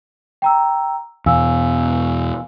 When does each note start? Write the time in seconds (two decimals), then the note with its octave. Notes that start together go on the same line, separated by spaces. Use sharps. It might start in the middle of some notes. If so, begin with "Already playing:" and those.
0.42 G5 A#5 E6
1.26 E2 B2 F5 G#5 E6